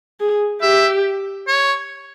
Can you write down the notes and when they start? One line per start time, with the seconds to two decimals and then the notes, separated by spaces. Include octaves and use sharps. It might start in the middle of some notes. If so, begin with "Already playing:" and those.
0.20 G#4
0.62 G4 E5
1.47 C#5